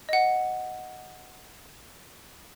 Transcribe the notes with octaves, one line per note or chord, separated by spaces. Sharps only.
D#5 F#5